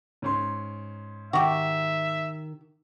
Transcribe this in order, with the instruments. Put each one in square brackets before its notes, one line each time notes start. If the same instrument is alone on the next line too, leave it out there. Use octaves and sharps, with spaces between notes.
[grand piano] G#2 C#4 C6
[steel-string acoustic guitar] D#3 [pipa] F#4 G4 [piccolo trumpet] E5